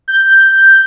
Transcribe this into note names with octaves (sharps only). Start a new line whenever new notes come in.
G6